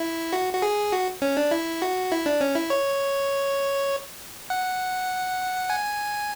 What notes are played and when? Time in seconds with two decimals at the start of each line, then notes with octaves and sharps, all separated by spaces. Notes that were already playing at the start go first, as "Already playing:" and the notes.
Already playing: E4
0.33 F#4
0.53 F#4
0.62 G#4
0.92 F#4
1.22 C#4
1.37 D4
1.51 E4
1.82 F#4
2.12 E4
2.26 D4
2.41 C#4
2.55 E4
2.70 C#5
4.50 F#5
5.70 G#5